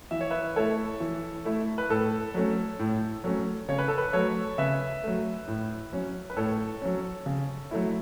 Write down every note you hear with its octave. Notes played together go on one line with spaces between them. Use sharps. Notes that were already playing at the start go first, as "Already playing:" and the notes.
E3 E5
C#5
B4 E5
A3 E4 A4 C#5
E3
A3 E4
B4
A2 A4
F#3 A3 C#4
A2
F#3 A3 C#4
C#3 C#5
B4
A4
B4
F#3 A3 A4 C#5
C#3 B4 E5
F#3 A3
A2
F#3 C#4
B4
A2 A4 C#5
F#3 C#4
C#3
F#3 A3 E4